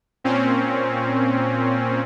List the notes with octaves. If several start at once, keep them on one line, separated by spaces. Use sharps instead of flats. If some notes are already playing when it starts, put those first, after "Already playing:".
A#2 C4 C#4